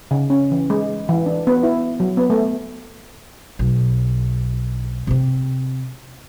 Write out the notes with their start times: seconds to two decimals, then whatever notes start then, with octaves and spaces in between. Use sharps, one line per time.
0.11 C#3
0.30 C#4
0.51 E3
0.70 G#3
1.09 E3
1.26 D4
1.47 B3
1.63 E4
2.00 F#3
2.17 B3
2.30 A3
3.59 B1
5.07 C3 C4